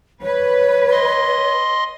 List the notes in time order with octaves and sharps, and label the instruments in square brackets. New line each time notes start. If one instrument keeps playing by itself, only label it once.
[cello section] B4 [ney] C#5
[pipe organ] D#5 C6